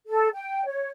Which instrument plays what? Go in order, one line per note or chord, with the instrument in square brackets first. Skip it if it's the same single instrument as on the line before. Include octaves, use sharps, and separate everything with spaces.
[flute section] A4
G5
C#5